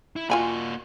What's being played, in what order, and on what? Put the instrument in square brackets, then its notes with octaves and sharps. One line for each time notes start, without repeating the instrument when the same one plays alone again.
[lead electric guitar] E4
[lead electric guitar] A#3 F#4 [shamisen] F4 G#5 B5